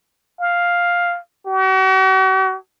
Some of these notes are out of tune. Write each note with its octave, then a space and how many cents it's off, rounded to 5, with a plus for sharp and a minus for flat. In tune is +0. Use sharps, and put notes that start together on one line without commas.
F5 +5
F#4 +45